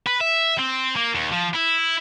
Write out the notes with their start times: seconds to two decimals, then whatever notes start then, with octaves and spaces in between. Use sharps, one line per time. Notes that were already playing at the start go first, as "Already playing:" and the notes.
0.07 B4
0.21 E5
0.59 C4
0.96 A#3
1.15 D#2
1.32 F3
1.54 E4